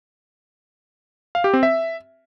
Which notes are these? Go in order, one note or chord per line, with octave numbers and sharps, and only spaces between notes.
F5
G4
C4
E5